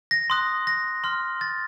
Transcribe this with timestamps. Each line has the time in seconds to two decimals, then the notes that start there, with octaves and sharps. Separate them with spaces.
0.11 A#6
0.30 C6 D#6 F#6
0.67 A#6
1.04 C6 F6
1.41 A6